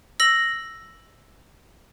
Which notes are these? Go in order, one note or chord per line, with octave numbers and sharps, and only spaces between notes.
E6 A#6 F#7